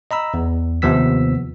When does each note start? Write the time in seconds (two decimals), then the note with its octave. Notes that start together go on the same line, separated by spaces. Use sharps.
0.11 D#5 A#5 B5 E6
0.34 E2
0.82 D#2 C3 F3 B3 E6 B6